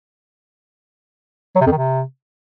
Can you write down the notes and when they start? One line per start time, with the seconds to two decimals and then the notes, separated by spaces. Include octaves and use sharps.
1.55 F#3
1.61 C3
1.66 F2
1.72 D#3
1.77 C3